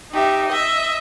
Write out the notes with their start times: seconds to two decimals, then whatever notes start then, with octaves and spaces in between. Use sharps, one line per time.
0.12 D#4 G4 E5
0.48 D#5 E5